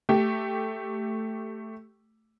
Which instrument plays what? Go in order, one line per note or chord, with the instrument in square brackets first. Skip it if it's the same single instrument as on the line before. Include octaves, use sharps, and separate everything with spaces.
[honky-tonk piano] A3 G4